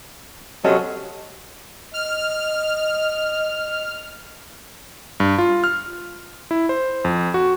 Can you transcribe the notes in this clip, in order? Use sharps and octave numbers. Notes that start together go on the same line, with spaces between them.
C3 F#3 C#4 A4 D#5
D#5 F6
G2
F4
F6
E4
C5
F2
F#4